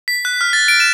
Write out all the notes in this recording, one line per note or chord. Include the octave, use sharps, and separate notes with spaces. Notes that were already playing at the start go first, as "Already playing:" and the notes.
B6
F#6
F6
A6
D7
E7